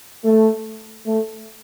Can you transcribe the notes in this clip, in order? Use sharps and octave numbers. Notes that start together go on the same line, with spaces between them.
A3
A3